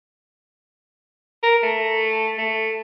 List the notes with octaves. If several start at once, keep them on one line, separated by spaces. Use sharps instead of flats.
A#4
A3
A3